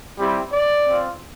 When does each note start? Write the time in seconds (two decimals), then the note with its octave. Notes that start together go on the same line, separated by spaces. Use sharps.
0.19 G3 C4 E4 G4
0.52 D5
0.86 C4 F4